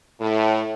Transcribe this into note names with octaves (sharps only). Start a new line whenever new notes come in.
A2